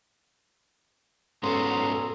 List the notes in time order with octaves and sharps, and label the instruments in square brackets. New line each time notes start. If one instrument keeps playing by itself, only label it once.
[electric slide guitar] G#2 B3 C#4 [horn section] F#3 G#4 A#5 [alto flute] A4 [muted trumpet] C6